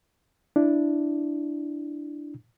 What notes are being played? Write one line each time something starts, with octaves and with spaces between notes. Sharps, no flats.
D4 E4